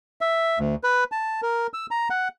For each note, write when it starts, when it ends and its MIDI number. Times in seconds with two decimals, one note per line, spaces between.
0.21 0.59 76
0.59 0.75 38
0.83 1.04 71
1.12 1.41 81
1.43 1.67 70
1.74 1.86 88
1.91 2.09 82
2.10 2.28 78